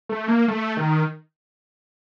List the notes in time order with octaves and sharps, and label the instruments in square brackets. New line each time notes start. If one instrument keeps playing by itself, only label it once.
[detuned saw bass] A3
A#3
A3
D#3